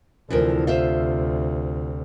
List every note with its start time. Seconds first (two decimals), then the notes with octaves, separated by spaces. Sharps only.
0.30 D2 C3 E3 F3 A#4
0.67 F4 C5 E5